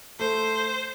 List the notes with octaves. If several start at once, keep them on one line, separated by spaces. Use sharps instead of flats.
A3 C5